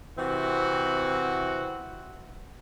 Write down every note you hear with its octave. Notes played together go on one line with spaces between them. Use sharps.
C3 E3 C4 F#4